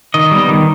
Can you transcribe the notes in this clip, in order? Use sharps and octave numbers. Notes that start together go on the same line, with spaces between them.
D#3 D#5
G3 B3
D#3